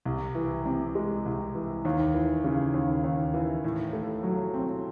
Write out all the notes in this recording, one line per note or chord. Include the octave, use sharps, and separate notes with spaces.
C2
E3
C3
G#3
C2
E3
D#2
E3
C#3
D#2
D#2
E3
A2
A3
F#3
C4